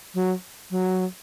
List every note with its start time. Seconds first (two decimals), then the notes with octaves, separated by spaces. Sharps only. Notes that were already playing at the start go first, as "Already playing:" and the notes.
0.14 F#3
0.71 F#3